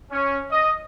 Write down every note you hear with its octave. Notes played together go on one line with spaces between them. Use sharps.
C#4
D#5